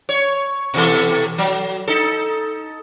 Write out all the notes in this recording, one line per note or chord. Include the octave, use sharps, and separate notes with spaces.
C#5
B2 E3 A4
F#3
D#4 A4